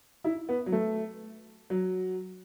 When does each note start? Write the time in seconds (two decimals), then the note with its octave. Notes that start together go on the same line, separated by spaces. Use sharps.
0.24 E4
0.49 B3
0.66 F#3
0.72 A3
1.70 F#3